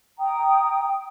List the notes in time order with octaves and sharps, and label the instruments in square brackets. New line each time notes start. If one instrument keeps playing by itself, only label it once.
[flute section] G5 A#5 D#6